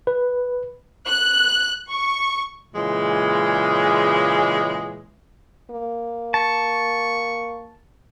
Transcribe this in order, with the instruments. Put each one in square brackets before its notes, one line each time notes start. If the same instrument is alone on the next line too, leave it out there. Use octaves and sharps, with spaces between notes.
[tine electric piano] B4
[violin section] F#6
C#6
[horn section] A#2 C#3 E3 G#3
[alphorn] A#3
[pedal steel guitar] A5 [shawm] C#6